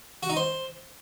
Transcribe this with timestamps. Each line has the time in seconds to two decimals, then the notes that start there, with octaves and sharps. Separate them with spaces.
0.23 F#4
0.29 D#4
0.36 C5